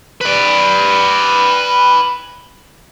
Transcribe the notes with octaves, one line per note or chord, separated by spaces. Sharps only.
B4 D5